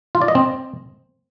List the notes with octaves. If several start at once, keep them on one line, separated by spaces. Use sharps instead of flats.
F4
D5
D#5
C4